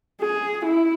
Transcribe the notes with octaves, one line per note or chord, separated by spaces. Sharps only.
G#4
E4